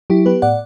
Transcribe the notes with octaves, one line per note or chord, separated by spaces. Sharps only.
F#3 E4 G4
B3 G4 B4
A2 D5 F#5